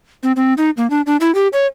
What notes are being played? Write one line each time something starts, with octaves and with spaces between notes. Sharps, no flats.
C4
C4
D#4
A#3
D4
D4
E4
G4
C#5